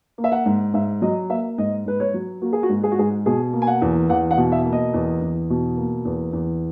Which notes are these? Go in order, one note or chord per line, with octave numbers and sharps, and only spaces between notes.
A#3
E5
F#5
G#2
G#2 E5
F#3 D#5
A#3 E5
G#2 D#5
G#2 B4
C#5
F#3
A#3 F#4
G#4
F#4
G#2
G#4
F#4
G#2 G#4
B2 G#4
A#3
G#5
F#5
E2
E2 F#5
F#5
B2
E5
A#3
D#5
E2
E2
B2
A#3
E2
E2